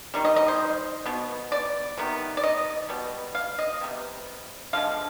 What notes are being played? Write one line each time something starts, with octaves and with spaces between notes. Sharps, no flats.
D#3 G3
D#5
D#5
C5
B2 B3
D5
C3 D#3 B3
D5
D#5
B2 G3 B3
F5
D#5
C3 G3 B3
D3 F3 G#3 F5